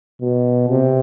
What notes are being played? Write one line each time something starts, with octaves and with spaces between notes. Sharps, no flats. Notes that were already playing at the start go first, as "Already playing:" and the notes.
B2
C3